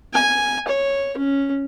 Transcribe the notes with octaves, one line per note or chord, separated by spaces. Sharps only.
G#5
C#5
C#4